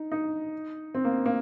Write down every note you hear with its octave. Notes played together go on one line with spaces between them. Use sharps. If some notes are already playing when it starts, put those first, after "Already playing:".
Already playing: D#4
D#4
C4
A#3
A#3